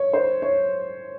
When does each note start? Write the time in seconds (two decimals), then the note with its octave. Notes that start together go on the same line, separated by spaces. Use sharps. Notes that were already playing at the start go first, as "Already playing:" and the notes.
Already playing: C#5
0.13 C5
0.42 C#5